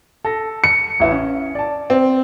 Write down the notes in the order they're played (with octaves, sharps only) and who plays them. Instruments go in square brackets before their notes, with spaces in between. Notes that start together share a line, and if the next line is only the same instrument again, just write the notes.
[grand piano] A4 A#6
[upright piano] C#7
[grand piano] A1 E4 B4
C#4
D5 A5
[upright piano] C4